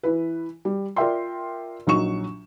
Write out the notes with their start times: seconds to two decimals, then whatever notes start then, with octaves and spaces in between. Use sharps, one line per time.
0.03 E3 E4 B4
0.65 G3
0.96 F4 A#4 D5 E5 G5 C6
1.87 A#1 F#3 D#4 C#6 E7